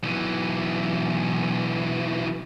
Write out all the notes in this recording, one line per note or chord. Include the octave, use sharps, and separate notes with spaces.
B1 E3